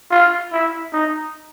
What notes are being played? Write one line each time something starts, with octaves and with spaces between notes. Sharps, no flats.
F4
E4
D#4